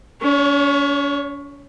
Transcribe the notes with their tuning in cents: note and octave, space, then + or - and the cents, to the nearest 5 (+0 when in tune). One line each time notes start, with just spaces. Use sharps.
C#4 +45 C#5 +5